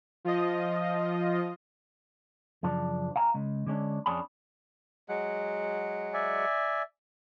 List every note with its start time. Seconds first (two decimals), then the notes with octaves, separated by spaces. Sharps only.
0.25 F3 F4 D#5
2.63 F#2 C#3 F3 D4
3.16 F5 G#5 A#5
3.34 C#3 G#3
3.67 D3 G#3 C#4 D4
4.06 F2 C#4 D4 G#4 B5
5.09 F#3 G#3 F#5
6.14 D5 E5 G#5